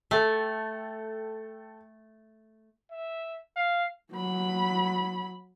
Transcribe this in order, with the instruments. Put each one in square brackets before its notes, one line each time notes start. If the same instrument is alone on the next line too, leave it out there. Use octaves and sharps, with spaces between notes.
[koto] A3 [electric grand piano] A4 G5
[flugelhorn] E5
F5
[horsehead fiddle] F#3 B5